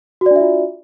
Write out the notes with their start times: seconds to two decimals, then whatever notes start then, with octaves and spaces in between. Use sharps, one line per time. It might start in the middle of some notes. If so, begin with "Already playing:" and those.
0.21 F#4
0.26 D5
0.31 D4
0.36 E5
0.41 F4